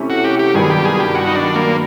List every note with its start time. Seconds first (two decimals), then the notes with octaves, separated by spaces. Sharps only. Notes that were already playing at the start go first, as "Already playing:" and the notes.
Already playing: C3 E3 A3 C#4 E4
0.10 F#4
0.24 G4
0.39 G4
0.54 G2 D#3 F#3 B3 G#4
0.70 G4
0.85 G#4
1.00 G4
1.15 F#4
1.27 D#4
1.35 D4
1.55 A#3